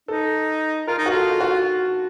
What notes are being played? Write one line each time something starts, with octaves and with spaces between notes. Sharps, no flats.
D#4 A4
F4 A#4
D#4
F#4
F4 A4
F#4